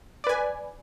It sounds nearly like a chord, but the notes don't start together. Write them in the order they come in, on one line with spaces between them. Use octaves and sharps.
D5 B4 G#5